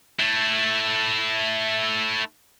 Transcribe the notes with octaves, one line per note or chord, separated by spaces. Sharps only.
A3 E4